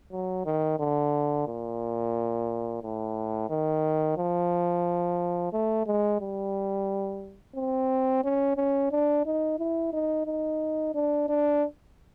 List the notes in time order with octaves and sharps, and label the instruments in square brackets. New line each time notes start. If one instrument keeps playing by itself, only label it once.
[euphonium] F#3
D#3
D3
A#2
A2
D#3
F3
A3
G#3
G3
C4
C#4
C#4
D4
D#4
E4
D#4
D#4
D4
D4